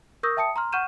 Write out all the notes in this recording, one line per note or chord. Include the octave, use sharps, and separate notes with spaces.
A#4 C#6 D#6 E6 G6 A#6
E5 G5 A5 D#6 C#7
A#5 C6 F6
F#5 C#6 F6 G6 D#7 E7